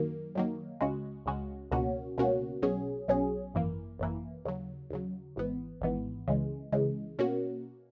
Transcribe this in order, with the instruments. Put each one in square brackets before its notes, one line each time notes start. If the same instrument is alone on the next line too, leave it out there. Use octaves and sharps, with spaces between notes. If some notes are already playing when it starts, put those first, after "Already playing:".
Already playing: [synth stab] F#2 D#3 F#3 A#3
F#2 D#3 F#3 A#3
C#2 C#3 G#3 C#4 F#4
C#2 C#3 G#3 C#4 F#4
C#2 B2 A#3 C#4 F#4
C#2 B2 A#3 C#4 F#4
B1 B2 F#3 C#4 G#4
B1 B2 F#3 C#4 G#4
G#1 F#2 E3 A#3
G#1 F#2 E3 A#3
D#2 C#3 F#3
D#2 C#3 F#3
G#1 G#2 E3 B3
G#1 G#2 E3 B3
C#2 C#3 E3 G#3
C#2 C#3 E3 G#3
B2 A#3 C#4 F#4